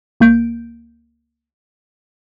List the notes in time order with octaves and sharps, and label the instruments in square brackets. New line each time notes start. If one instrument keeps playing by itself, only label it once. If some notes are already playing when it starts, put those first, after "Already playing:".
[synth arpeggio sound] C#2 A#3 G6 D7